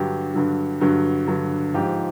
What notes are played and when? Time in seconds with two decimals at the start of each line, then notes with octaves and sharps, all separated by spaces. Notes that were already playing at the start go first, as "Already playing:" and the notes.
Already playing: G2 D3 F#3 G4
0.34 G2 D3 F#3
0.81 G2 D3 F#3
1.27 G2 D3 F#3
1.74 G#2 F3 G4